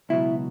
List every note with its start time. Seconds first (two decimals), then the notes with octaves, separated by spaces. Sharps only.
0.09 C#2 B2 F#3 E4